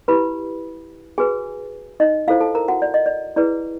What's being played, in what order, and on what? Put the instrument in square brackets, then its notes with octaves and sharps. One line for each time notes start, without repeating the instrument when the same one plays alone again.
[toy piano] E4 G4 B4 B5
F#4 G#4 B4 G#5
D#4 D#5
E4 F4 A4 C5 F5
A4 A5
A#4 A#5
F#4 F#5
D5
D#5
D5
E4 G#4 B4 D5